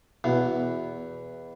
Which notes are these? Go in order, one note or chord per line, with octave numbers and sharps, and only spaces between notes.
E2 B2 E3